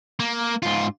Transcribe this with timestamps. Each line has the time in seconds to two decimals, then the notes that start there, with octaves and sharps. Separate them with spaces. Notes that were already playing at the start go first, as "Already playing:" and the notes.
0.20 A#3
0.63 G#2 F4